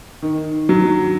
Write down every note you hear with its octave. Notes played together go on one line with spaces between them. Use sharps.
D#3
F#3